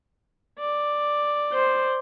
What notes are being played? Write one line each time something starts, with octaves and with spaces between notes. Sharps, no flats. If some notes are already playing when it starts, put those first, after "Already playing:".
D5
C5